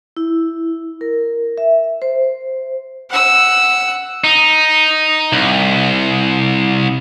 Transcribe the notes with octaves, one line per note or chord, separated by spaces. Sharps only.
E4
A#4
E5
C5
F#5 E6
D#4
C2